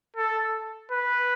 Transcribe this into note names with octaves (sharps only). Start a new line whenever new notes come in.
A4
B4